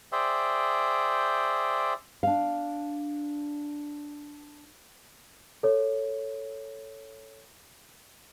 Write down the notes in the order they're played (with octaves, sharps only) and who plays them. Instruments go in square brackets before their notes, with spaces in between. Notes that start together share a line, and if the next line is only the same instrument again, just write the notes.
[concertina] G#4 C5 D5 E5 G5
[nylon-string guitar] D4 F5
[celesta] A4 C#5